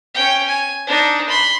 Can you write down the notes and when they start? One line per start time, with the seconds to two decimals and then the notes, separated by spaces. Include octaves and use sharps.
0.14 C#4 G5
0.47 G#5
0.87 D4 D#4
1.29 B5 C6